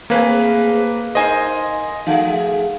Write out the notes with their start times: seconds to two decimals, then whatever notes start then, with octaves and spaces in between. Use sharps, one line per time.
0.10 A3 A#3 C4 G#4 B4 F5
1.15 D#4 A#4 C5 D#5 G#5
2.07 F3 A3 D#4 G#4 F5 F#5